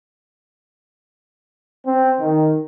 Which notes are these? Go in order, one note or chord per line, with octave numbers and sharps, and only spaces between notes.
C4
D#3